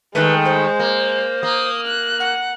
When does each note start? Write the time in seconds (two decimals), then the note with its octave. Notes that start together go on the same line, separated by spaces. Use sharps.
0.15 D#3 G#3 A3 B4
0.45 C5
0.80 A#3
1.43 A#3 D#6
1.86 F#6
2.20 F#5